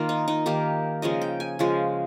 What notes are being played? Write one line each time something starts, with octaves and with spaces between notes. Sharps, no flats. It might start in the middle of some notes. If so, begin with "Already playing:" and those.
Already playing: D#3 A#3 F4
D#4
D#4
D#3 A#3 G4
C#3 F3 G#3 D#5
G5
G#5
C#3 F3 G#3